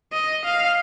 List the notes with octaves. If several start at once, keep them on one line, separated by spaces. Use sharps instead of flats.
D#5
F5